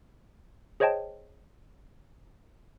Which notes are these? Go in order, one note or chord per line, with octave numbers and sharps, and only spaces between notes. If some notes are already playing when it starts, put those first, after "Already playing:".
G#4 C5 C#5 D#5 G5 A5